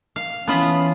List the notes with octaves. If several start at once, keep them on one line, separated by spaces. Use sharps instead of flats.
F5
E3 B3 C#4 F4 A5 B5 D#6